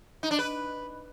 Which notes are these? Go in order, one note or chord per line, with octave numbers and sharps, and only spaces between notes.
D#4
D4
B4